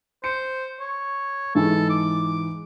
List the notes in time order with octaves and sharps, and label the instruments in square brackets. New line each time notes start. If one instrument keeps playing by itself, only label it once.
[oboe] C5 [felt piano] C#7
[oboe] C#5
[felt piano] G#2 E3 G#3 [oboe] A4
[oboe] D6